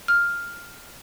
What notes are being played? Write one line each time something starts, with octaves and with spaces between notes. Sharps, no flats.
F6